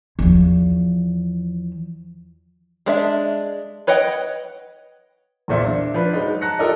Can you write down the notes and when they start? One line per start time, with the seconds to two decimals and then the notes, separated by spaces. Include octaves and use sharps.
0.19 E2 F3
2.86 G#3 D4 E5
3.87 B4 C#5 D#5 F#5 G5
5.48 B1 E2 A#2 C5 E5
5.66 D4
5.94 F3 D4 B4
6.13 F#3 G#3 D#4
6.41 A5 A#5 F#6 A#6 C#7
6.59 F4 G4 A4 A#4 D5 D#5